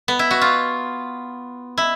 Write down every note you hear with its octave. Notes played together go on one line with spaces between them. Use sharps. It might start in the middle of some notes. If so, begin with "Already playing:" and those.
B3
E4
F#4
F4
E4